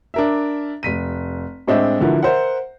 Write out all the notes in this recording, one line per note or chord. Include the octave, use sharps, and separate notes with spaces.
D4 A#4 E5
F1 B6 D#7
A2 G#3 C4 D4 D#5 E5
D3 E3 F3 E4 F#4 A#4
A#4 C5 E5 F#5